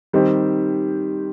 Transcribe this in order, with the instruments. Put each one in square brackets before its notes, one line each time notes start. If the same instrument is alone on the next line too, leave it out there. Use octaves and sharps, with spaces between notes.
[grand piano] D#3 G3 C4 G4 C5